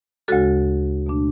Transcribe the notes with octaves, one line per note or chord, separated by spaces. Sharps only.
D2 C#3 G#3 F#4 A4
B2 A3 D4